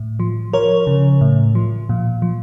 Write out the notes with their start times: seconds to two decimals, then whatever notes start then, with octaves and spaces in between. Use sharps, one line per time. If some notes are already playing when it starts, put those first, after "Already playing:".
Already playing: A2
0.20 F3
0.53 F3 A#4 C#5
0.87 C#3
1.21 A2
1.55 F3
1.89 A#2
2.22 F3